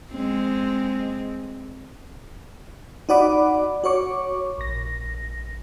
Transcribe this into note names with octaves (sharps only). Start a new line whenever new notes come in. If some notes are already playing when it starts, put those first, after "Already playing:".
G#3 C4
D#4 F#4 D5 F#5 B5 D6
F#4 C#5 C#6 D6
A#1 A#6